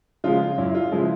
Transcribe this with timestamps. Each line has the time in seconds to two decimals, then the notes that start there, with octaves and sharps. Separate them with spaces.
0.24 C#3 F3 G#3 F4
0.58 F#2 E4
0.75 F4
0.92 C#3 F3 G#3 E4